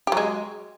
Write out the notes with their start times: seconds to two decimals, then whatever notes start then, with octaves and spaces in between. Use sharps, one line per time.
0.07 G4
0.12 F#3
0.17 G#3